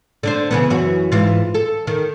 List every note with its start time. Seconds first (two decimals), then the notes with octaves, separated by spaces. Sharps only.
0.23 D3 D4 C5
0.51 C#3 E3 B3
0.70 F#2 E3 F#4
1.12 G#2 E3 F4
1.54 A4
1.87 D#3